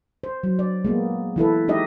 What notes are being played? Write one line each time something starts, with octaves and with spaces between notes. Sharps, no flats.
C5
F#3
D5
G#3 A#3 B3
E3 E4 A4 B4
G#3 D#4 G4 D#5 E5